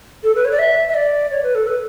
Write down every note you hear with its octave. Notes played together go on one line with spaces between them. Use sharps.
A4
B4
C#5
D5
E5
E5
D5
C#5
B4
A4
B4